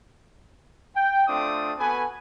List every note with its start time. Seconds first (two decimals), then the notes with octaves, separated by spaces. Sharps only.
0.95 G5
1.28 A3 C4 D4 F4 D6 D#6
1.79 B3 F#4 A4 B4 G#5